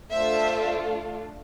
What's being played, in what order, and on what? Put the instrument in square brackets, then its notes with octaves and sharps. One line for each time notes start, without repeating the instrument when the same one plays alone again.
[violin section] A3 D4 F4 A4 C5 E5